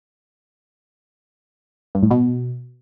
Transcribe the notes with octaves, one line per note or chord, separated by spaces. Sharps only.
G2
A2
B2